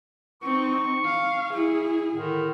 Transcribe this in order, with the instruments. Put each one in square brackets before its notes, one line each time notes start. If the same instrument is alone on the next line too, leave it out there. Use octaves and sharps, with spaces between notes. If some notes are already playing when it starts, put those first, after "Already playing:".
[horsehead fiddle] C4 D#4 [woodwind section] C#6
[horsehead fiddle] F5
E4 G#4
[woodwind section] A2 D3 D#3